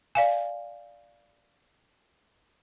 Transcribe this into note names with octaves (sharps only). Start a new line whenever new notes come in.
D5 F5 G#5